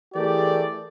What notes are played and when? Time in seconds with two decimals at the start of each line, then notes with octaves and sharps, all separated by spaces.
0.15 E3 A3 G4 G#4 A#4 D5